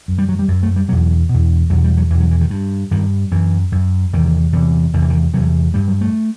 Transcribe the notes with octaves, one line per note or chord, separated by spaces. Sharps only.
F#2
G3
F#3
G3
F#2
A3
G3
E2 B2 F#3
E2 B2
E2 B2 F#3
G3
F#3
E2 B2 E3
F#3
E3
D#3
G2
G2 D#3
F#2 E3
F#2
E2 C3 D#3
E2 C3
E2 C3 D#3
E3
D#3
E2 C3 F#3
G2 G3
F#3
A3